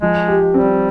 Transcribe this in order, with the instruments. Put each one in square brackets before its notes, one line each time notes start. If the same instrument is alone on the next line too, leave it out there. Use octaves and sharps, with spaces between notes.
[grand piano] F3 [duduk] G#3
[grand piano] G4
[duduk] G3 [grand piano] C4